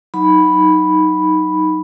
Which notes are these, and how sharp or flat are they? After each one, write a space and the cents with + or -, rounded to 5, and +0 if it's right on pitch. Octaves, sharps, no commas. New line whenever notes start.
F#3 +0 D#4 +0 B5 +0